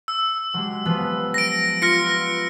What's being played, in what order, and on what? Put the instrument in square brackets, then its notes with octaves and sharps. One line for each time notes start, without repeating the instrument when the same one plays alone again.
[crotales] E6
[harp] F#3 G#3 G4
F3 B3 B4
[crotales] A#6 D7
[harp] F4 [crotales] F6 A#6 C#7
[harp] B4 D7